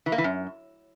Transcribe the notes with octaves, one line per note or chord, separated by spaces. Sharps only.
E3
A#3
E3
F#2